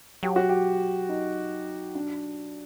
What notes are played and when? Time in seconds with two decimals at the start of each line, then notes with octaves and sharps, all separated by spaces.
0.23 F#3 G4
0.36 F#4
0.49 G4
1.09 D#4
1.95 D4